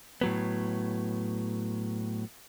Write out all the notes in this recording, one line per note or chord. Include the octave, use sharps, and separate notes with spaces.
A2 F#3 B3